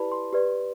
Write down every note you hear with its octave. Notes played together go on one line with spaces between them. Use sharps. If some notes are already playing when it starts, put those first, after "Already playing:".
Already playing: E4 G4 B4 D5 A5 B5
C6
G4 B4 D5